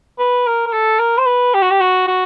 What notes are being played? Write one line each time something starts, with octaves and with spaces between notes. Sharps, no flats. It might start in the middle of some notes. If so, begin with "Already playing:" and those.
B4
A#4
A#4
A4
A#4
C5
B4
G4
F#4
G4
F#4
F#4